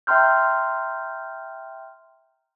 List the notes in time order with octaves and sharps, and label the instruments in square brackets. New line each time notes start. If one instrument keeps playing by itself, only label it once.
[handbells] E5 G5 A#5 C6 F6 G6